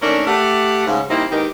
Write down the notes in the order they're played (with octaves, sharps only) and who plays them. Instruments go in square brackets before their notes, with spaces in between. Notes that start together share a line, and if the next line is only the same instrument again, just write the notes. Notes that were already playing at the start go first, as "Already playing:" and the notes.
[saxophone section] D#3 A3 A#3 C#4 D4 A#4
A3 G4 F#5
G#2 C#3
G3 A#3 C4 D#4 E4
G#2 D#3 E3 A#3 D#4 G4